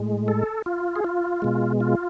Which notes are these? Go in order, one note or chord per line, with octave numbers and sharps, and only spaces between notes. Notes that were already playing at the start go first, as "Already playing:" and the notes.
Already playing: A2 G#3
A4
F4
G#4
F4
B2 G#3
F4